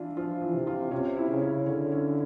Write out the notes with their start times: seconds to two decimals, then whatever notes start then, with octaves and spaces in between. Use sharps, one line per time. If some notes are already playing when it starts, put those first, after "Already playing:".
Already playing: E3 D4 F4
0.17 F3 F4
0.41 E3
0.54 C3
0.67 F4
0.91 C3 C#4
1.17 E4
1.29 C#3
1.42 C#4
1.66 D3 C#4
1.92 C#4